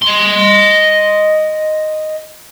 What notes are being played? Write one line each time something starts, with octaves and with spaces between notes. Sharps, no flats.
D#5 C6